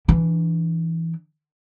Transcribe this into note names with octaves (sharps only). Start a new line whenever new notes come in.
E3 D4